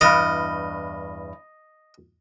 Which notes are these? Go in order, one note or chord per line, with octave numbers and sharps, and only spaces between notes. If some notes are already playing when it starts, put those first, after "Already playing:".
E2 G2 D#5